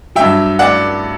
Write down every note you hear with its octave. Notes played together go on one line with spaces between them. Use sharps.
G2 F#3 E5 G5
D5 F#5